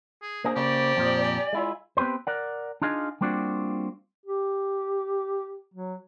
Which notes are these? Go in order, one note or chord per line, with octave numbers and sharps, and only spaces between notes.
G#4
A#3 D4 G#4 C5
C#3 A#3 G4 D5
F2 A#2 F3
G#5
G#3 E4 F4
B3 C4 G4 B4 C5
A#4 D5 F#5
D4 D#4 F4 G#4 D#5 F5
G3 A#3 C4 D4 F4 F#4
G4
F#3